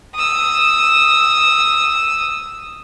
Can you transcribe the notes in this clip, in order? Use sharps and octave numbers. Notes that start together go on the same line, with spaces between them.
D#6 E6